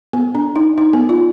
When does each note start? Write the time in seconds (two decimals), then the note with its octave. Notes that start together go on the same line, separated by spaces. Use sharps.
0.13 B3
0.35 D4
0.56 D#4
0.78 D#4
0.93 B3
1.09 F4